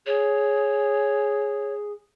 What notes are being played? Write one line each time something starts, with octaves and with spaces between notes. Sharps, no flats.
G#4 C#5